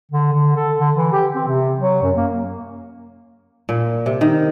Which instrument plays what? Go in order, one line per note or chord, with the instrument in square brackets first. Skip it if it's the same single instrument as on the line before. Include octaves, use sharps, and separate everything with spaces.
[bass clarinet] D3
D3
A4
D3
E3
G4
C4
C3
F#3
F#2
A#3
[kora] A#2
C3
D#3